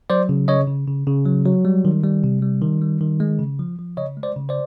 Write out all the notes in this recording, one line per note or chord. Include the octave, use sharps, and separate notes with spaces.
F#3 C5 D5
C#3
C#3 C#5 D#5
C#3
C#3
C#3
F#3
F#3
G3
D#3
G3
C3
G3
D#3
G3
D#3
G#3
C#3
F3
F3
C#3 C#5 D#5
G#3
C5 D5
C#3
C5 D5